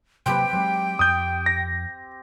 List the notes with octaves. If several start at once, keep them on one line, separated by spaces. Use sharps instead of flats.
C3 F#3 A#3 C4 G4 B4 G5
F#3 G#3 C4
F2 D#6 G6
A#6